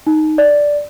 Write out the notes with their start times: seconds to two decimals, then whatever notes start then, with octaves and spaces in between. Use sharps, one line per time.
0.07 D#4
0.38 D5